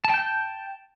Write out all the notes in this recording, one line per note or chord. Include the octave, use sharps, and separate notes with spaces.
G5 A5 G6